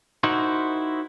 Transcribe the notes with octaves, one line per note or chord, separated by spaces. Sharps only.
D#4 E4 F#4 A#4 C5